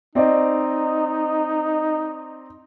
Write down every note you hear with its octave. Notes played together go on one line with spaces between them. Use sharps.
C4 D#4 D5 D#5